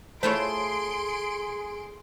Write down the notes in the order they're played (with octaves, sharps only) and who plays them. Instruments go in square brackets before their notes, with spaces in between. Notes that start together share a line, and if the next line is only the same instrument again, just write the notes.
[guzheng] A3 E4 F4 [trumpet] G#4 [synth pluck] C5 C#5 [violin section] C6 D7